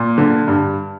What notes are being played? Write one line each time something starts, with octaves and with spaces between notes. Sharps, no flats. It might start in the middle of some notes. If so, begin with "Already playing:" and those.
Already playing: A#2
D3
G2